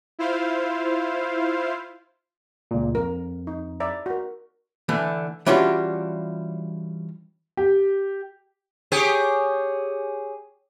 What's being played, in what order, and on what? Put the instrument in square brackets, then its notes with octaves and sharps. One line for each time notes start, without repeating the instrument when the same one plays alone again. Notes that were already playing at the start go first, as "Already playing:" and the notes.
[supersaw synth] E4 F4 C5 F5
[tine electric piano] C#2 A#2
[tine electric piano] F2 [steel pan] A#4
[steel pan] D#4
D5 E5 A#5
F#4 A#4
[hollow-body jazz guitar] D3 E3 A3
E3 G3 C#4 D4 F4 F#4
[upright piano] G4
[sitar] G4 G#4 C#5